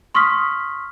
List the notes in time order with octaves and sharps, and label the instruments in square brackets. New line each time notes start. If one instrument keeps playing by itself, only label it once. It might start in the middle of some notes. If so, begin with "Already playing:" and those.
[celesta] C6 C#6 D#6 F6 B6